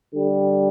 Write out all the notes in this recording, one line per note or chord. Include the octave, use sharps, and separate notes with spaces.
D3 G3